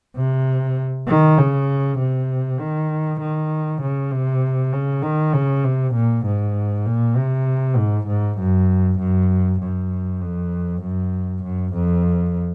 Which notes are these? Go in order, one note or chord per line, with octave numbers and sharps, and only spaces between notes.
C3
D#3
C#3
C3
D#3
D#3
C#3
C3
C#3
D#3
C#3
C3
A#2
G#2
A#2
C3
G#2
G#2
F#2
F#2
F#2
F2
F#2
F#2
F2